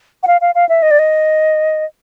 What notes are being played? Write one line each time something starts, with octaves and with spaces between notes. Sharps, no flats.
F#5
F5
F5
F5
E5
D#5
D5
D#5